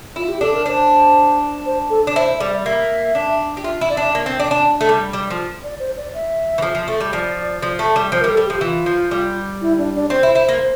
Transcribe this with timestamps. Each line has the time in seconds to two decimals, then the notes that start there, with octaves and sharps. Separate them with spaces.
0.16 E4 F4
0.29 G4
0.41 D4 A4
0.54 A#4
0.66 D4 C5
1.66 C5
1.90 A4
2.07 D4
2.15 E4 C5
2.40 G3 D5
2.65 A#3 E5
3.15 D4
3.57 G4
3.64 F4 E5
3.81 E4
3.90 D5
3.97 D4 E5
4.15 A#3
4.26 C4
4.40 D4
4.51 D4
4.81 A3
4.89 G3
5.13 G3
5.31 F3
5.63 D5
5.79 C5
5.97 D5
6.14 E5
6.58 E3
6.62 F3
6.75 F3
6.88 A3
7.00 G3
7.13 F3 D5
7.62 F3
7.79 A3
7.96 G3
8.12 F3 C5
8.21 A#4
8.24 G3
8.29 A4
8.37 G3
8.46 F3 G4
8.61 E3 F4
8.86 F3
9.11 G3
9.61 E4
9.78 D4
9.95 D4
10.10 C4 C5
10.23 E4
10.35 E4
10.49 A#3